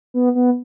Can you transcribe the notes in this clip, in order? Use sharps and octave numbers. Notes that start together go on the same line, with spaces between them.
B3
B3